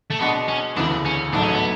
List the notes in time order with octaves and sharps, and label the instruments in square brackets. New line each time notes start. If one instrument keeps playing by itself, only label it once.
[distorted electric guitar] A3
[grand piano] B2 G#3 D4 F#4 [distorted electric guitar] B3
[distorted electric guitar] C#4
[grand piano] E1 D2 C#3 E3 B3 [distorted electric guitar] D4
[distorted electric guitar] C#4
[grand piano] A1 G#2 F#3 A3 [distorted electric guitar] D4
[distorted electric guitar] C#4
B3